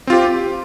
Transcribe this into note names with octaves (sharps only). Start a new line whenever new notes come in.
C4 F4 G4